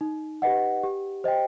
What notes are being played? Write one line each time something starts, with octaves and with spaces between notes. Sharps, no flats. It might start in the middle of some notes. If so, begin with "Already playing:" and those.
D#4
G4 B4 D#5 F#5
G4
C5 D#5 G5